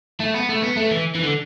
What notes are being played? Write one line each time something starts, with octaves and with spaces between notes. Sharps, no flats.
A3
B3
A3
B3
A3
E3
E3
D3